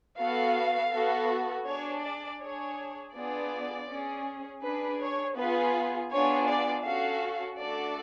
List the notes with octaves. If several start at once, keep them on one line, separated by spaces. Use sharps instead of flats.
B3 F#4 A4 F5
B3 F#4 A4
D4 G#4 C#5
D5
D4 G#4 C#5
B3 D4 F4 G#4 D5
C#4 G#4
D4 G#4 B4
C#5
B3 F4 G#4 B4
B3 D4 F4 G#4 C#5
D5
C#4 F#4 A4 F5
A3 D4 F#4 A4 D5